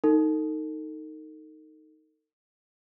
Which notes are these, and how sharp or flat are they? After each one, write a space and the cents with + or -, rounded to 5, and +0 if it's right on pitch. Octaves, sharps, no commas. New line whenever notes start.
D#4 +0 A4 +35